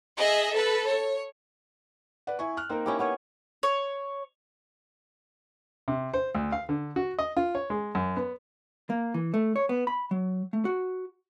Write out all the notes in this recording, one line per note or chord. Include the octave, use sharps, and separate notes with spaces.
G#4 D#5 E5
A4 B4
C#5
B4 D5 F#5
E4 G#5 C#6
F6 F#6
A#3 C4 D#4 A#4
C#4 E4 G4
B3 C#4 C#5
C#5
C3
C5
D2
F5
D3
F#4
D#5
F4
C#5
G#3
F#2
B3
A#3
E3
A3
C#5
B3
B5
F#3
A3
F#4